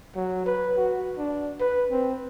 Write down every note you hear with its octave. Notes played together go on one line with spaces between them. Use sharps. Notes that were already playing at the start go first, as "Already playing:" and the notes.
F#3
B4
F#4
D4
B4
C4